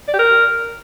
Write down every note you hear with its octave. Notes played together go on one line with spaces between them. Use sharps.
D5
G4
A#4